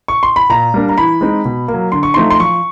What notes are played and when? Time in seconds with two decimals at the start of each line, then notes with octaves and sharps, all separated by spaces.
0.08 C#6
0.23 C6
0.36 B5
0.49 A#2 A#5
0.74 G3 A#3 D4
0.89 A#5
0.97 E3 B5
1.21 G#3 C4 D#4
1.45 B2
1.68 A#3
1.74 F#3
1.92 D3 C6
2.03 C#6
2.14 F3 A3 C4 D#4 C6
2.30 C6
2.40 F3 C#6